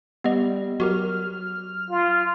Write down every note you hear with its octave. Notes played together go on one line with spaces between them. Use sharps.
G3 B3 D#5
F#3 F#4 G4 A#4 F6
F4